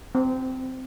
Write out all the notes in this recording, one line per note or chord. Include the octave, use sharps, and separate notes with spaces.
C4